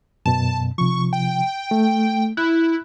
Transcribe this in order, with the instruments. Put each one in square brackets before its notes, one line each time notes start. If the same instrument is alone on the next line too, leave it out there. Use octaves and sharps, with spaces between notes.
[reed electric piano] F#2 B2 [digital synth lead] A5
[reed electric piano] C3 F3 [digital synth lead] C#6
[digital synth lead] G5
[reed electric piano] A3
[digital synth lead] E4 [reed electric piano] F#6